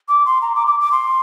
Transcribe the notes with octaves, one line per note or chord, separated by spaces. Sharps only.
D6
C6
A#5
D6
D6
D6
C6